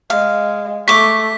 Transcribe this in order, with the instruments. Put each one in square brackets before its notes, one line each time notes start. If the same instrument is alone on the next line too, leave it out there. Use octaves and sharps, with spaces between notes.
[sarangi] G#3 [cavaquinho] F5
[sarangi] A3 [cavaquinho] C#6 D6 [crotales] B6